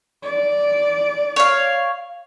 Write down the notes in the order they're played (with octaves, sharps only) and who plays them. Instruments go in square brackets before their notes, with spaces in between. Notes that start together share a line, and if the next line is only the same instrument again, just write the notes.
[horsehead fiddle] D5
[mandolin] C#5 F5